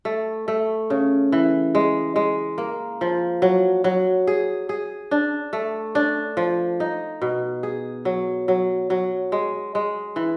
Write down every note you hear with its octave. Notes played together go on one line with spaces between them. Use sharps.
A3
A3
C#3
E3
G#3
G#3
A#3
F3
F#3
F#3
G#4
G#4
D4
A3
D4
F3
D#4
B2
G#4
F#3
F#3
F#3
G#3
G#3
E3